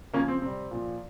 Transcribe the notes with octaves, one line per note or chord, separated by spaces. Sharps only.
C#3 F3 A#3 C#4
C4
C3 G3 C4
A#2 F3